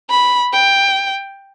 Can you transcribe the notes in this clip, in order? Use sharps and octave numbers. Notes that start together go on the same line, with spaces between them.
B5
G5